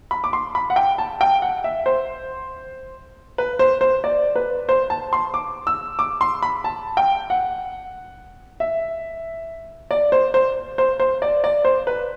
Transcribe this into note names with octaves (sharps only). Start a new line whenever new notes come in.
B5
D6
C6
B5
F#5
G5
A5
G5
F#5
E5
C5
B4
C5
C5
D5
B4
C5
A5
C6
D6
E6
D6
C6
B5
A5
G5
F#5
E5
D5
C5
C5
C5
C5
D5
D5
C5
B4